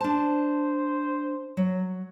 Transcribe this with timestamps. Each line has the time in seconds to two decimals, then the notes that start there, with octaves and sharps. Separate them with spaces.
0.01 D4 C5 A5
1.57 F#3